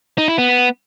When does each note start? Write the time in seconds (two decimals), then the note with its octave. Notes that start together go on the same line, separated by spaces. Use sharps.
0.18 D#4
0.28 E4
0.38 B3